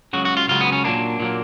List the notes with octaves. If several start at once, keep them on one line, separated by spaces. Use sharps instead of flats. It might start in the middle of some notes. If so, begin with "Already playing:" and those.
C#2 C#3 F#3 F#4
F#4
F4
C#2 C#3 F#3 F4
B3
C#4
A#2 F#3 A#3 D4
A#2 F#3 A#3